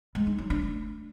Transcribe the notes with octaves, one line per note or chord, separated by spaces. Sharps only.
G#3
D#4
F#3
D4
A3